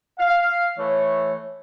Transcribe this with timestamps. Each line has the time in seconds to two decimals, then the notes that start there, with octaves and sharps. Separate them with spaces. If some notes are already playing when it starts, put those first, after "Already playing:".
0.19 F5
0.78 E3 A3 C#5